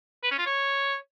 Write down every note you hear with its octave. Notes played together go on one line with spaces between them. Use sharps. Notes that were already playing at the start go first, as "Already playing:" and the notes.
B4
C#4
F4
C#5